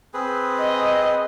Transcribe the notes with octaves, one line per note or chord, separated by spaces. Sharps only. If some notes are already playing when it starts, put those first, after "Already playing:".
C4 G#4 B4
D#5